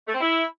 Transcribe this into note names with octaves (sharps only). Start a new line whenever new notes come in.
A3
C4
E4